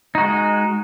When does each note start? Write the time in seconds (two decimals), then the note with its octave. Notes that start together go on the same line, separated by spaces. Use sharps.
0.15 D#4
0.18 F#4
0.21 G#3